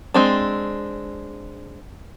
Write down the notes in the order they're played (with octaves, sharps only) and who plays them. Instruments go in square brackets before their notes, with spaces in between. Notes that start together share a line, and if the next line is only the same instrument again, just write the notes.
[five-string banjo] G#3 C4 D4